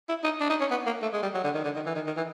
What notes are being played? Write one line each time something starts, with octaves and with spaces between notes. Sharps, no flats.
E4
D#4
D4
D#4
C#4
B3
A#3
A3
G#3
G3
F#3
D3
D#3
D3
D#3
E3
D#3
D#3
E3